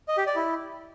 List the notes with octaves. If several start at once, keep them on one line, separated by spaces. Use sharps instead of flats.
D#5
G4
D5
E4